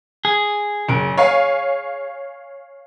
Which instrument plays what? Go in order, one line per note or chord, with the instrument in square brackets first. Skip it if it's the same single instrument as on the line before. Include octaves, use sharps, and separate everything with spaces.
[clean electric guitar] G#4
[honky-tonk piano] F#1 D7
C#5 F5 G#5